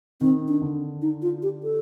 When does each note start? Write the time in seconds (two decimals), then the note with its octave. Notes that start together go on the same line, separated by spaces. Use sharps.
0.21 D#3 C4
0.48 D4
0.62 D3
1.02 D#4
1.22 F4
1.43 G4
1.63 A4